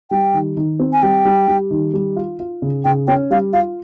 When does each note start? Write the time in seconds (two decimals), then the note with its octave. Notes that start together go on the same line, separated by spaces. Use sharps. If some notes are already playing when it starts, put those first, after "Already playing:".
0.11 G3 G5
0.34 D#3
0.57 D#3
0.80 C4
0.93 G#5
1.03 G3 G5
1.25 G3
1.48 G3
1.71 D#3
1.94 G3
2.16 F4
2.40 F4
2.62 C#3
2.85 C#3 G5
3.08 C#4 G5
3.31 G3 F5
3.53 F4 F5